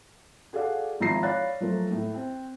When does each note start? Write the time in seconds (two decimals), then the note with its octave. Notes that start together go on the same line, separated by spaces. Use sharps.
0.53 F#4 G#4 A4 D5 F5 F#5
1.00 G#1 F3 E4 A#5 A#6 C7
1.23 C#5 D5 F5 B5 F#6 A6
1.61 F3 F#3 A3 A#4 C5
1.91 A2
2.15 C4